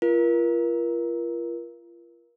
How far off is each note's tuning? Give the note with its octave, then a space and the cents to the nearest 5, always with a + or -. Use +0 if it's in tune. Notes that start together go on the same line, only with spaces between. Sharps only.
F4 -35 A#4 +30